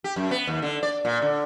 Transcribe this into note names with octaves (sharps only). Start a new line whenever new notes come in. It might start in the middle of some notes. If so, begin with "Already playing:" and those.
G4
F#2
B3
D#2
D3
D5
A#2
D3